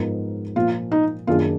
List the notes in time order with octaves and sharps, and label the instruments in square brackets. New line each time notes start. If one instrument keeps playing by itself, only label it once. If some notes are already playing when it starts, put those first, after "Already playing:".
Already playing: [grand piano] G#2 F3 B3 D#4 A#4
[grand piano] A#2 F3 A#3 [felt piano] F4
[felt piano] D#4
[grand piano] F#2 D#3 A#3 D4 G#4 [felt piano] F4